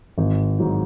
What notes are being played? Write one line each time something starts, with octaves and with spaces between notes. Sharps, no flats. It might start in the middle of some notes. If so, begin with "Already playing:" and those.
G#1
G#2 F#3